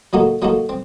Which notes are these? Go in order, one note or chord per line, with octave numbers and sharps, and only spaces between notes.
F#3 A#3 D#4 F#4 A4
F#3 A#3 D#4 F#4 A4
C4